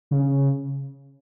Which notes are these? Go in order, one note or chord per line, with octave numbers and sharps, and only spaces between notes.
C#3